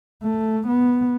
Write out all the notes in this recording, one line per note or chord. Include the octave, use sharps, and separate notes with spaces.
A3
B3